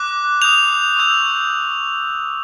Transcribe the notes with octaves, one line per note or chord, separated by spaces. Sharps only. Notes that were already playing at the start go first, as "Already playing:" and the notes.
Already playing: D6 F#6
D#6 G6 F7
C#6 E6 G6